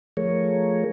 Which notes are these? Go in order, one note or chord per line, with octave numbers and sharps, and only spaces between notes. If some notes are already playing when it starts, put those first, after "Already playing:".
F3 A3 G#4 A#4 C#5